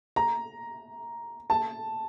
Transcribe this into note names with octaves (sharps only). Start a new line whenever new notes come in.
A#5
A5